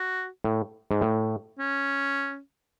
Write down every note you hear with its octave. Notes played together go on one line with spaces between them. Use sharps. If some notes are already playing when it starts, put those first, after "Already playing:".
Already playing: F#4
A2
G#2
A2
C#4